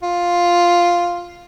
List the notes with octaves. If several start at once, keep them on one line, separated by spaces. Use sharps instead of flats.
F4